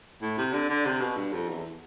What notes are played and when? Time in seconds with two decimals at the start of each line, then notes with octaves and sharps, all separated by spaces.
0.22 A2
0.38 C3
0.53 D3
0.69 D3
0.85 C3
1.01 B2
1.17 G2
1.33 F2
1.49 E2